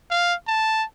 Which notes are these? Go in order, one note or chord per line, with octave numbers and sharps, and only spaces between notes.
F5
A5